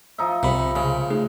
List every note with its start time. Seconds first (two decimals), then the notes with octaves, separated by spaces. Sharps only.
0.18 F3 D#4 E5
0.43 C2 C3 B5
0.76 C#3 G#3
1.10 A3 D#4 G#4